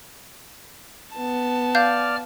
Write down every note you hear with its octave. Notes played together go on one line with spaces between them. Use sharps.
B3 A5
D5 F5 F6 G6